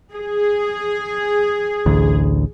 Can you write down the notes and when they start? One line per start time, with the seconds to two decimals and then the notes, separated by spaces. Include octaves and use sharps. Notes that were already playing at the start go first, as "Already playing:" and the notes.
0.13 G#4
1.86 A1 D2